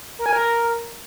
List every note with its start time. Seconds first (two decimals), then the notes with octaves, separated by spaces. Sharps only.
0.19 A#4
0.26 G#5
0.33 A#4